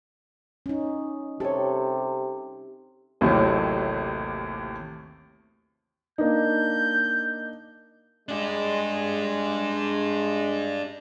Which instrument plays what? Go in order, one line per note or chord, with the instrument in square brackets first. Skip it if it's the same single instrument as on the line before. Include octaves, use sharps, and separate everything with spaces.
[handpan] C#4 D#4
[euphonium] C3 [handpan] G4 [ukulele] A4 C#5
[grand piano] A1 D#2 A2 C3 F#3 A3
[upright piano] A#3 D4 D#4 [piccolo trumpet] G6
[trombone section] G#3 [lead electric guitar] D4 G4